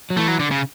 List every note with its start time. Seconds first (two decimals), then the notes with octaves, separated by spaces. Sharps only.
0.10 F#3
0.17 E3 A3
0.28 F#3
0.39 D3
0.51 C#3